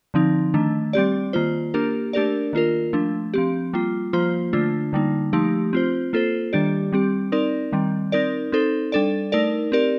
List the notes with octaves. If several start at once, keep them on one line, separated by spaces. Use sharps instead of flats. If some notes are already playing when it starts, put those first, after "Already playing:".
D3 F3 C4 D#4
D#3 A3 D4
G3 C4 G4 D5
D#3 A#3 F4 C5
A#3 D4 G4 A#4
A3 D4 G4 A#4 D5
D#3 A#3 F4 A#4
F3 A3 D4
F3 C4 G4
G3 A#3 F4
F3 A#3 F4 C5
D3 A3 D4 F4
D3 G3 A#3 D#4
F3 A3 D#4 G4
C4 F4 C5
A#3 F4 A4 C5
D#3 G3 D4 G4 D5
G3 C4 G4
C4 D#4 A#4 D5
D#3 G3 C4
C4 D#4 A#4 D5
C4 D#4 A4 C5
G3 D4 A4 D5
A3 D#4 A#4 D5
C4 G4 A#4 D5